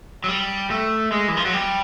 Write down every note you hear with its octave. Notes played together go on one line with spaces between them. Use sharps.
F#3
G3
A3
G#3
E3
F3
F#3
G3